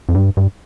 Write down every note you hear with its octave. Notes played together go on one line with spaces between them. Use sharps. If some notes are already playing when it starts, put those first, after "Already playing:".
F2
G2
G2